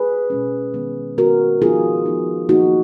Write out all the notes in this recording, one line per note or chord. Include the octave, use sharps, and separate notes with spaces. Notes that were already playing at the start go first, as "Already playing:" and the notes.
Already playing: G#4 B4
B2 G#3 C#4
D#3 G#3 B3
D#3 G#3 B3 F#4 A#4
F3 B3 D#4 F4 G#4
F3 B3 D#4
F3 A#3 D#4 F#4